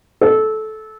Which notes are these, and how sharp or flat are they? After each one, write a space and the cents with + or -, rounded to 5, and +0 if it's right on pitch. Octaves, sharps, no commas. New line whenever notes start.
A4 -15